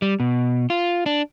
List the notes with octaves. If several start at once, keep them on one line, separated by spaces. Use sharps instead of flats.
G3
B2
F4
D4